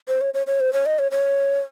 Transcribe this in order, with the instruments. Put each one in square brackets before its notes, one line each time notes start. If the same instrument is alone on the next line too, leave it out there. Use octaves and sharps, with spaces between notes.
[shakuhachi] C5
C#5
C#5
C#5
C5
C#5
D#5
C#5
C#5